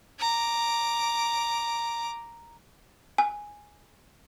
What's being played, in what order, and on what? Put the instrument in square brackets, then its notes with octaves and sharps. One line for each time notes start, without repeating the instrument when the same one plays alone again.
[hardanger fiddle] A#5 D6
[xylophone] G#5